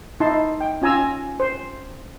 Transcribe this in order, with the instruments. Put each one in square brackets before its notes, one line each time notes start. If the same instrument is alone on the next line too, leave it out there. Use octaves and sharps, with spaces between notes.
[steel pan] D#4 E4 A5 C6
G5
C#4 F4 G#5 A#5 E6
C5